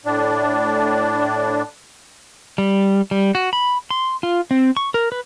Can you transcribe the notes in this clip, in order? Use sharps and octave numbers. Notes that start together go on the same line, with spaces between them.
A2 D4
G3
G3
F#4
B5
C6
F4
C4
C#6
A#4
B4